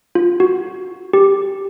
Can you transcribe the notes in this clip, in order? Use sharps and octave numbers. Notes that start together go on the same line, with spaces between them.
F4
F#4
G4